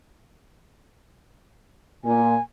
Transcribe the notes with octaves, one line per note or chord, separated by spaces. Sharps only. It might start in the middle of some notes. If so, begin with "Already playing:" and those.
A#2 G#5